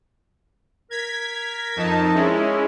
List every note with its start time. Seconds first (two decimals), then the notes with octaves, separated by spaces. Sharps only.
0.91 A#4 G#6 B6
1.76 F2 D#4 A5
2.15 G#3 C#4 E4